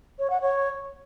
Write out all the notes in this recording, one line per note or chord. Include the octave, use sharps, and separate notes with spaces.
C#5
F#5
C#5